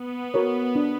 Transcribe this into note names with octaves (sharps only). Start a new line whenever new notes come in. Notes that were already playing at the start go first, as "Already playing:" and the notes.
Already playing: B3
F#4 A#4 C#5
D4